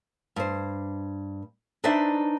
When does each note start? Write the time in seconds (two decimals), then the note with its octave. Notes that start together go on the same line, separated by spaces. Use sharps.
0.36 G2 C5
1.84 D4 D#4 B4 C5 D5 E5